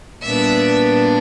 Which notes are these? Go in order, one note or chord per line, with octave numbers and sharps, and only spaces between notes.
A#2 G3 B3 D4 E5